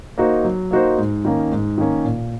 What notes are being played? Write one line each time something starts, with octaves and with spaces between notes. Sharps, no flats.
A#3 D#4 F#4 C5
F#3
A#3 D#4 F#4 C5
G#2
D#3 A#3 C#4
G#2
D#3 A#3 C#4
A#2